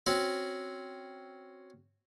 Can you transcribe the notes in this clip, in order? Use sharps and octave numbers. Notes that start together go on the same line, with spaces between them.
C4 C#4 F#4